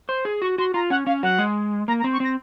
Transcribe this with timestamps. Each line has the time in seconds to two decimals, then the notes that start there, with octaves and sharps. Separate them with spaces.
0.09 C5
0.25 G#4
0.41 F#4 C#6
0.58 F#4 C6
0.74 F4 A#5
0.90 C#4 F#5
1.06 C#4 F5
1.23 F#3 F#5
1.38 G#3
1.88 A#3 A#5
1.99 A#5
2.04 C4
2.12 C#6
2.20 C4 A#6